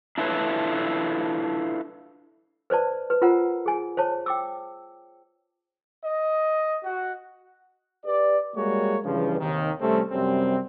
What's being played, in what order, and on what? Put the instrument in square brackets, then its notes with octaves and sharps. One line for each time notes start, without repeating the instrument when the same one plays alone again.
[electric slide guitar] D4 E4 F4 A4 B4 C#5
[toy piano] B4 C5 D5 A5
B4
F4 A#4 C5 F#5 A#5
G#4 G#5
C5 C#5 A5
G5 D6 E6
[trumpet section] D#5
F#4
[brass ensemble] G4 B4 D5
G3 G#3 A#3 F#4 C#5
G2 C#3 E3 F3
D#2 C3 D#3
C3 G3 A3 C4 C#4
F#2 C3 G3 C4